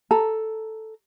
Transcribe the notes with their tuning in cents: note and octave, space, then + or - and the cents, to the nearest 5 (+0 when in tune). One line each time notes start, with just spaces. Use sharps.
A4 +0 A#5 +0